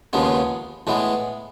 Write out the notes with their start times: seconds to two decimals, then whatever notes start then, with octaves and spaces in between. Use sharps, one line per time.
0.13 D#2 C#3 F3 G#3 B3
0.87 A2 E3 G#3 B3